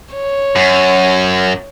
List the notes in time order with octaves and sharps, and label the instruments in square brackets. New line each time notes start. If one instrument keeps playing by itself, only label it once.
[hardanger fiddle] C#5
[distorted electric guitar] F#2